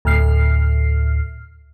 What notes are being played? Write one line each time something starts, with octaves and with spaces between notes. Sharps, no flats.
D2 A2 F6 C7